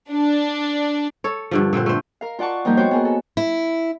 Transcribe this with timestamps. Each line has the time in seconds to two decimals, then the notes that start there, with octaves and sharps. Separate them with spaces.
0.12 D4
1.24 A4 C#5
1.51 G2 D3 F3
1.73 A#2 D3 C4 C5
1.86 A3 C5
2.21 A#4 F5
2.39 F4 D5 F#5 A5 C#6
2.65 F3 G3 A#3 D#4 A#4 G6
2.77 B3 F#4 C5 C#5 G5
2.91 B3 G#4 A#4
3.05 A4
3.37 E4